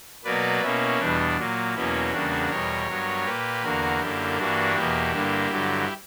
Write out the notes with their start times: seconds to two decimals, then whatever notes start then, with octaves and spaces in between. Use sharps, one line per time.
0.25 B2 F#3 A#3 B4 D5
0.62 B2 A#3 C#4 E4
1.00 E2 B2 G3 D4
1.37 A#2 F#3 A#3
1.75 E2 B2 F#3 A#3 C#4 E4
2.12 E2 C#3 G3 A#3 D4 F#4
2.50 E2 B2 G3 A#4 C#5
2.88 G2 F#3 B3
3.26 A#2 A#3 G4 B4
3.63 E2 D3 A#3 F#4 A#4
4.00 F#2 D3 A#3 E4 G4
4.38 G2 E3 G3 A#3 D4 F#4
4.75 E2 B2 A#3 E4 G4
5.13 G2 D3 A#3
5.50 G2 D3 F#3